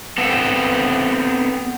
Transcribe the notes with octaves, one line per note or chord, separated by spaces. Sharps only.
B3 C4 A4